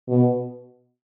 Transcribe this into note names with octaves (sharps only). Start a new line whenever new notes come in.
B2